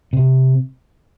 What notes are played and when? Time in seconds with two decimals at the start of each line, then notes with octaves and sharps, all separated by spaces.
0.13 C3